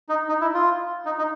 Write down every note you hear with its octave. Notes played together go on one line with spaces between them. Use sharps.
D#4
D#4
E4
F4
D#4
D#4